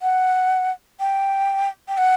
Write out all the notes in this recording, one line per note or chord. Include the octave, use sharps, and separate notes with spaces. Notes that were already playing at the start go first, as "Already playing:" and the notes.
F#5
G5
G5
F#5